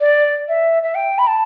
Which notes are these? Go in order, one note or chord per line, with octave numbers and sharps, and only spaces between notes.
D5
E5
E5
G5
B5
A5